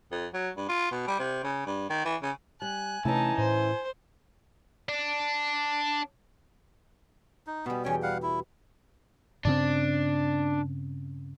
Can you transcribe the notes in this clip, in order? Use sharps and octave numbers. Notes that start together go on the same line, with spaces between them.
F2
F#3
G2
F4
B2
G3
C3
C#3
G2
D#3
E3
C#3
G3 G#5 F#6
C3 E3 A3 C#4 D#4 E4 A5
A2 C5
D4
D#4
B2 G3 B3
E2 C#4 C#5 G5 G#5
G3 F5 F#5
E4
G2 C#3 C4 D4